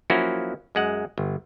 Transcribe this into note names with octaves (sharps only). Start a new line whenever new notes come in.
F3 F#3 A#3 C#4 E4 F#4
F#2 G#3 F#5
G1